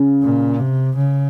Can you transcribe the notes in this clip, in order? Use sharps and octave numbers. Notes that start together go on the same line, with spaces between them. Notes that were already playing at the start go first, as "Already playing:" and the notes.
Already playing: C#3
A#2
C3
C#3